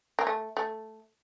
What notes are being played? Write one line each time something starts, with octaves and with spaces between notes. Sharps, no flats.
A#3
A3
A3